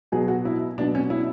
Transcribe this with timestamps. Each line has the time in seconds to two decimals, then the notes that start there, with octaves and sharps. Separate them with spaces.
0.12 B2 F#3 G#4
0.28 F#4
0.45 E4
0.78 B2 D4
0.81 F#3
0.95 C#4
1.10 E4